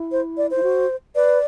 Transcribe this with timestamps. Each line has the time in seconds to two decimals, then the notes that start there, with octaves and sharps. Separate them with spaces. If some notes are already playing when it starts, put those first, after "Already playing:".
Already playing: E4
0.12 C5
0.37 D5
0.51 C5
0.56 E4
0.63 F#4
1.15 B4 D5